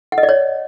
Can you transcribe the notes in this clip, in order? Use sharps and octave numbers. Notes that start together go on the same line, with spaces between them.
F#5
D#5
D5
C#5